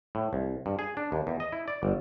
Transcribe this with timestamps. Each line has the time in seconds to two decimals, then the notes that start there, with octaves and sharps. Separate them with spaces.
0.15 A2
0.33 C2
0.66 G2
0.79 G#4
0.97 D4
1.12 D#2
1.27 E2
1.40 D#5
1.52 E4
1.68 D5
1.83 G1